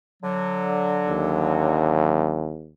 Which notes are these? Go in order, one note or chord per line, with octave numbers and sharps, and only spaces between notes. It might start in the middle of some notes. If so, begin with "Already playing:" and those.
D3 F#3
D#2